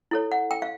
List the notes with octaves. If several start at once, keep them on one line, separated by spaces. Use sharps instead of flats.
E4 A4 C#5
F#5
G5
F5